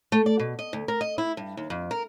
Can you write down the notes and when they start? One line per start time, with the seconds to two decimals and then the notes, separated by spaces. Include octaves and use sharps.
0.12 A3
0.26 D5
0.40 B2
0.59 D#5
0.73 D2
0.88 A#4
1.01 D#5
1.18 E4
1.37 G2
1.57 D#2
1.70 F2
1.91 A#4